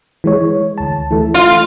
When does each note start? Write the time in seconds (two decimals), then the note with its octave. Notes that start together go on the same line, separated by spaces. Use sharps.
0.24 E3 G#3 C#5
0.78 D2 A5
1.11 E3 A3 A4
1.34 F4